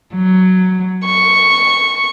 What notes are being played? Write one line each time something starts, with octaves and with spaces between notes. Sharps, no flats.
F#3
C#6